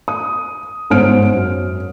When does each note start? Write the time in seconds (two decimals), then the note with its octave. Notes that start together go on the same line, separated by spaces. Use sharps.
0.08 D#6
0.90 G1 G#2 C#4 C5 F6 D7
1.34 F#2